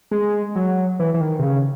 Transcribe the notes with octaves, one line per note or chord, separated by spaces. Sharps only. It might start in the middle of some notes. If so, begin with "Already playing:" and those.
G#3
F#3
E3
E3
D#3
C3
C#3